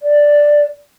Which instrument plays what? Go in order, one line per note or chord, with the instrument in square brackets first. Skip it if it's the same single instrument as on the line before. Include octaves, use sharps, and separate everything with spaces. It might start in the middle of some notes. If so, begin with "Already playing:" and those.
[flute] D5